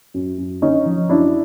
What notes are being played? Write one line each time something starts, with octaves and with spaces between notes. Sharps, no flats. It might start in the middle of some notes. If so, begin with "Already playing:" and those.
F#2
F#2
D3 C#4 D#4
F3
F#2 D4 E4